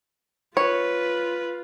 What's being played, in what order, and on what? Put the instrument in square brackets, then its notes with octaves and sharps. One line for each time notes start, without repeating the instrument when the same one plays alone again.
[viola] F4 [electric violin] B4 [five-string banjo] C#5